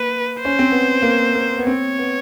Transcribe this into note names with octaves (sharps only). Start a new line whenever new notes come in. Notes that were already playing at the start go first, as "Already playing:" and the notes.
Already playing: A#3 B4
C5
C#4
C4
B3
A#3
A#3
B3
C4 C#5
B3